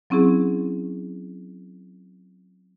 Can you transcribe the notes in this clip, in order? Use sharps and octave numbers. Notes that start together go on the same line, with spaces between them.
F#3 C4 C#4 E4 G#4